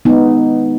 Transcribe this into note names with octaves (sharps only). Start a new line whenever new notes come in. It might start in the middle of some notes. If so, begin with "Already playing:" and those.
D#3 G#3 B3 D#4